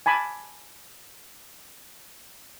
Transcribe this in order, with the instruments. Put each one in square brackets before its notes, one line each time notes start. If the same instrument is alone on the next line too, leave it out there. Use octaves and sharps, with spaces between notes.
[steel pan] G#5 A5 B5 D6